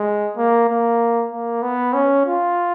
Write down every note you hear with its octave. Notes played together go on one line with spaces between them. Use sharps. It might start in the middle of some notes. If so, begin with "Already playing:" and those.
Already playing: G#3
A#3
A#3
A#3
B3
C#4
F4